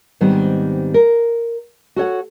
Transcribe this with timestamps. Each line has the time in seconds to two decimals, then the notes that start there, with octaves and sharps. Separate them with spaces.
0.21 G#2 D#3 G3 B3 C4
0.94 A#4
1.96 F#4 A4 C#5 F#5